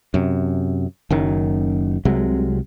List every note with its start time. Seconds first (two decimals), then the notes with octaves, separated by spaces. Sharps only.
0.14 F#2 C3
1.10 F#1 F#2 D#3
2.05 C2 C3 F#3 G#3